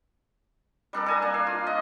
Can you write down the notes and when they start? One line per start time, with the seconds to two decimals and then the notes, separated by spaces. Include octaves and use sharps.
0.93 G3 D4 A4 A#4
1.06 A4 G#5 A#5
1.22 A#3 D4
1.34 F5
1.47 F4
1.67 D#5